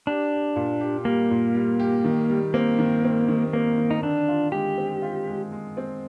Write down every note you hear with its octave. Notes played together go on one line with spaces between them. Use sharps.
D4 G4
G4
A#2
G4
G3 A#3
A#2
G3
G4
D#3
G3
A#3 C4
D#3
C4
D#3
A#3 C4
D#3
D#4
D3 D4
F4
G#3 G4
C4
F4
G#3
G#3
C4